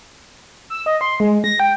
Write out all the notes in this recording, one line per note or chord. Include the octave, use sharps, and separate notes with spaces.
E6
D#5
C6
G#3
A#6
G5